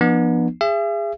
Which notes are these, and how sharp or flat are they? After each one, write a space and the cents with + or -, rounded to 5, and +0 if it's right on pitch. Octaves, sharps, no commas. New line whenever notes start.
F3 -20 B3 -25 D4 +45
G#4 -20 E5 +40